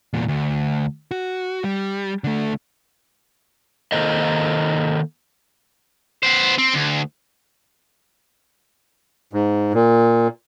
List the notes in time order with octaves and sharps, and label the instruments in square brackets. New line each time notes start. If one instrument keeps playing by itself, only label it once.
[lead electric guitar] E2 A#2
D2
F#4
G3
D3 A3
[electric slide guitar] D#3 A#3 A4 A#4 C5 D#5
[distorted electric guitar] B3 C5
C4
D2
[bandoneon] G#2
A#2